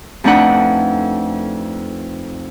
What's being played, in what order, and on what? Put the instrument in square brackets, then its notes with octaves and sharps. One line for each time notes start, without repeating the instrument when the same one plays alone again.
[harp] F2 A3 D4 D#4 B4 F#5